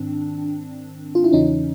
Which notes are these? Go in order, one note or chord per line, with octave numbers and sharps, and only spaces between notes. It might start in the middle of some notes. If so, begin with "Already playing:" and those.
Already playing: G#2 D#3 C4 D4
F4
E4
E2 C#3 E3 C#4 D#4